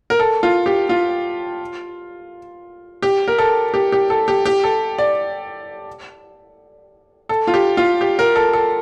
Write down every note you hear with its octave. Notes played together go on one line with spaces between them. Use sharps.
A#4
A4
F4
G4
F4
G4
A#4
A4
G4
G4
A4
G4
G4
A4
D5
A4
F4
G4
F4
G4
A#4
A4
A4